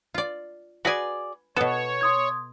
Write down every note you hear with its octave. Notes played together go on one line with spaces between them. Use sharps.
F4 D5
F#4 G#4 B4 D5 G#5
B2 B3 A4 C#5 E7
C6 D#6 G#6